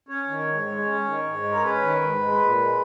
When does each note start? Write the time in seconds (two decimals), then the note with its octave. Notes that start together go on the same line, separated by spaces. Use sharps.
0.08 C#4 C#5
0.27 D#3
0.47 G#2
0.66 G#3
0.86 C#4
1.05 D#3
1.24 G#2
1.43 G#3
1.52 A#4
1.63 C#4 B4
1.82 D#3
2.01 G#2
2.21 G#3
2.40 A#2
2.58 G#3